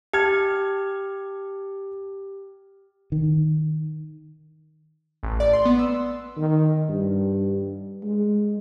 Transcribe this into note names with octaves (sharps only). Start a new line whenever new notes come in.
G4 A5 F6 G#6
D#3
A1
D5
C6
B3
E6
D#3
G2
G#3